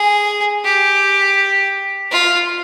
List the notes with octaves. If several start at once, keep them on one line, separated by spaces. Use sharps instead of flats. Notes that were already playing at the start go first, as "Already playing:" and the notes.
Already playing: G#4
G4
F4